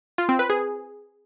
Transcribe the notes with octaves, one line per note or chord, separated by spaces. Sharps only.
F4
C4
B4
G#4